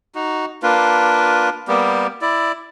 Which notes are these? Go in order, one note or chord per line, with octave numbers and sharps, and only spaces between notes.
D#4 F#4
A#3 D4 F4 B4
G3 A#3 B3 G4
E4 D5